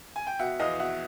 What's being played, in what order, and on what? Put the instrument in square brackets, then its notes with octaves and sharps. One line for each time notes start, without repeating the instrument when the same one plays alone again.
[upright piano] G#5
G5
B2 E5 F#5
E2 D#5 F5
B2 E5 F#5